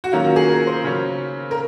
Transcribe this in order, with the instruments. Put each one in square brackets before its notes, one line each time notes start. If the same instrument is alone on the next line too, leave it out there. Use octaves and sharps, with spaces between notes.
[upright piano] F#4
D#3 F#3 A#3 C#4 F4
F#4
G#4
A#4
C5
C#3 F#3 C#4
A#4